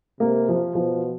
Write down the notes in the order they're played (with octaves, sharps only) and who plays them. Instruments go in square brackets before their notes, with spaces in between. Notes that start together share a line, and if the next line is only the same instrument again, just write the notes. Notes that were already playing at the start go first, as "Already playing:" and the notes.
[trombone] C3 [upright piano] A#3
[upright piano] F3
[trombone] B2 [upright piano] F3